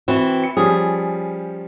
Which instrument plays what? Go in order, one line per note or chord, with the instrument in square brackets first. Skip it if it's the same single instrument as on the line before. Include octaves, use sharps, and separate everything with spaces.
[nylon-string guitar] E3 C4 F#4
[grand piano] C#7
[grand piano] F3 G3 C#4 [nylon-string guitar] G#4